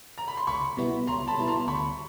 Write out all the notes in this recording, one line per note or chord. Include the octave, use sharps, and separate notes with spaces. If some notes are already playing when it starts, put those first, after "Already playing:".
A#5
B5
C6
C#2 B5 C#6
B2 G3 B3 E4
C#2 A#5 C6
A5 B5
B2 G3 B3 E4
A#5 C6
D2 B5 C#6